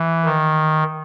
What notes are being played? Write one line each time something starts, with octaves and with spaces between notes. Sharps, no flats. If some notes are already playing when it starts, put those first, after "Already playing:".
Already playing: E3
D#3